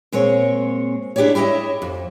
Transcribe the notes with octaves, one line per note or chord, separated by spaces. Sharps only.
A#2 G#3 C4 C#5
D2 D4 E4 G4 G#4 C#5
E4 G4 C#5 D#5 E5
F2